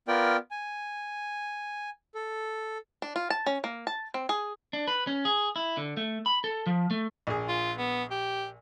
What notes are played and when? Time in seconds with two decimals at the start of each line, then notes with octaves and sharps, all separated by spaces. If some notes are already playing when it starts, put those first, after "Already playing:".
0.08 B3 F4 A#4 D5 G5
0.51 G#5
2.15 A4
3.02 D4
3.16 F4
3.30 A5
3.46 C#4
3.64 A#3
3.87 A5
4.14 C4
4.29 G#4
4.73 D4
4.88 B4
5.07 C#4
5.25 G#4
5.56 E4
5.77 D3
5.97 A3
6.26 B5
6.44 A4
6.66 F3
6.91 A3
7.27 A#1 G#4
7.48 F4
7.77 B3
8.11 G4